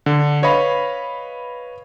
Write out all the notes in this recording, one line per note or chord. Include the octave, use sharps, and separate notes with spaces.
D3
B4 C#5 D#5 F5 B5